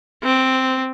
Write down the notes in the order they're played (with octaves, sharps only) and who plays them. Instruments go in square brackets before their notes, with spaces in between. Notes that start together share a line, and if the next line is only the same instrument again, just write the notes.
[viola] C4